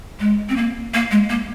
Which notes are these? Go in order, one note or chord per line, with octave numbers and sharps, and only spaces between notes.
G#3
C4
A#3
A#3
G#3
A#3